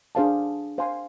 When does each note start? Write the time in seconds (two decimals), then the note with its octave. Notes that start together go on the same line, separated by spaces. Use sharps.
0.15 D4 G#4 C5 F5 A5
0.78 C5 F5 G#5 C6